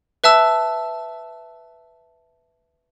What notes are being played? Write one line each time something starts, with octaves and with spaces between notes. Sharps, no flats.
B4 E5 A5 E6